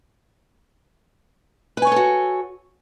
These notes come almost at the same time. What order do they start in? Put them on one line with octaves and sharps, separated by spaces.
B4 G#5 C#5 A4 F#4